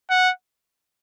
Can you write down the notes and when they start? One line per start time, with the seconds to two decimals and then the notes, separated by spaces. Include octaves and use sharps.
0.10 F#5